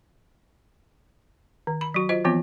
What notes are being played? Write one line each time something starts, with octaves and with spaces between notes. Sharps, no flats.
D#3
B5
F#3 F#4
F4 C5 D#5
E3 F3 B3 C4 F4